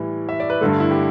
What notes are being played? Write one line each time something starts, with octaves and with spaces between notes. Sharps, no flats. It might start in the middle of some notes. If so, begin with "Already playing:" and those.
Already playing: A2 E3 G3
E5
D5
B4
G2 D3 A3 A4
E4
G4